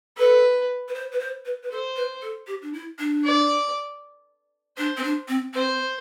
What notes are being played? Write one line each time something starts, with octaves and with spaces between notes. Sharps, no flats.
A4 B4
B4
C5
B4
C5
B4
B4
A4 C5
B4
A4
G4
D4
E4
D4
D5
D4 C5
C4
D4
C4
C4 C5